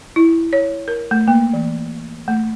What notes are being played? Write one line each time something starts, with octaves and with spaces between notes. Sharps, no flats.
E4
C#5
A#4
A3
A#3
E3
A3